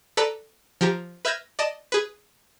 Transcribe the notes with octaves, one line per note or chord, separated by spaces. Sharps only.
A4 B4 D5 A5 A#5
F3 G4 A#5
B4 E5 F6 G6 G#6 A#6
D5 D#5 A5
G#4 B4